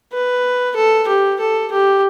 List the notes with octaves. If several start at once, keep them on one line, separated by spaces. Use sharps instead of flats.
B4
A4
G4
A4
G4